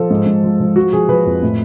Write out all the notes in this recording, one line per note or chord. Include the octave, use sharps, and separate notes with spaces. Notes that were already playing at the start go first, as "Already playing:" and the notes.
Already playing: F3 A4
G#2
G#2
F3
F3
F3 F#4
F3 G#4
F3 B4
F2
A2